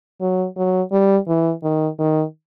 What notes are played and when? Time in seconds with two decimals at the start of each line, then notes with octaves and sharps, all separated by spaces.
0.21 F#3
0.57 F#3
0.92 G3
1.28 E3
1.63 D#3
1.99 D#3